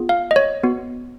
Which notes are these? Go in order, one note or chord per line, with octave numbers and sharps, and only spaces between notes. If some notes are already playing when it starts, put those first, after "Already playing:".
Already playing: B3 F4 G#4
F5
D#5
C#5
B3 F#4